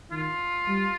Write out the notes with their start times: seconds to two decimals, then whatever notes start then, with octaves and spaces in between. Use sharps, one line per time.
0.11 D#3 F4
0.67 G3